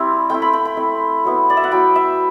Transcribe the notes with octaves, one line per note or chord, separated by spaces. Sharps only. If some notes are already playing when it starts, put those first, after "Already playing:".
Already playing: G3 C4 E4
A3 C4 E4 G5
B5
B5
B5
A3 C4 E4
F#3 B3 E4
D5
E5
F#5
F#3 B3 E4 G5
E5